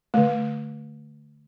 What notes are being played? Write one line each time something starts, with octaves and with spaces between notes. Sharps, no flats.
D3 A3